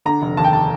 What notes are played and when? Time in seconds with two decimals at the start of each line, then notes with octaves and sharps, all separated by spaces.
0.05 D3 A#5
0.22 F1
0.37 D#2 A5
0.44 G5
0.53 A5